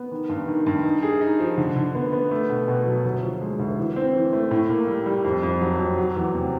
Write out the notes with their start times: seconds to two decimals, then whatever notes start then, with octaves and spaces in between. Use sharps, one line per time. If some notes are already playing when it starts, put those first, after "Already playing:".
Already playing: B3
0.12 D#3
0.29 G2
0.48 D#3
0.66 G2
0.84 D#4
1.02 G#4
1.21 D#4
1.40 F3
1.58 D3
1.76 D3
1.95 B3
2.13 B3
2.31 A3
2.49 B2
2.68 B2
2.86 F#3
3.05 D2
3.23 F3
3.41 G#3
3.60 D2
3.78 E3
3.96 C4
4.15 E3
4.33 A3
4.51 A2
4.69 A#3
4.87 G3
5.06 G3
5.25 F2
5.43 F2
5.61 F#3
5.79 F2
5.98 F#3
6.16 E2
6.34 C3